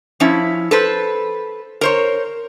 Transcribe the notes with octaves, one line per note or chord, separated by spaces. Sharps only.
F3 C#4 E4
A4 B4 C5
A#4 C5 C#5